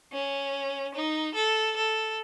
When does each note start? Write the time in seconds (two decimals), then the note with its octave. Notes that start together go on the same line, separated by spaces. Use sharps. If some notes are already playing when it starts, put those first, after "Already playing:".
0.13 C#4
0.95 D#4
1.35 A4
1.76 A4